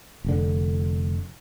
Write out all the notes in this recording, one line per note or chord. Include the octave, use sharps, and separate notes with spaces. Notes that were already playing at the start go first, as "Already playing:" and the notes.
F1 D3